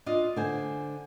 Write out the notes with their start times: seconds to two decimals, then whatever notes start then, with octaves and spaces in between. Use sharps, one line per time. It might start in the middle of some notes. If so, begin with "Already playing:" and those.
0.06 D4 F4 D#5
0.36 D3 C5 G#5